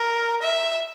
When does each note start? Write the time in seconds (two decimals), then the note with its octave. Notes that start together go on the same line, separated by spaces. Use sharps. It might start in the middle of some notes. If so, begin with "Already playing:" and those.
Already playing: A#4
0.42 E5